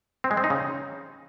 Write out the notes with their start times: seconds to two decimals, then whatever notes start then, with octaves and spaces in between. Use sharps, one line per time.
0.24 C4
0.31 G#3
0.37 C4
0.44 D#4
0.50 C#3